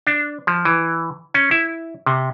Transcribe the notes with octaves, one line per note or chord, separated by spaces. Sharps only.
D4
F3
E3
C#4
E4
C3